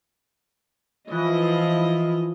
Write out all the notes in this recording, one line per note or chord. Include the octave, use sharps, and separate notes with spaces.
E3 F3 E4 D#5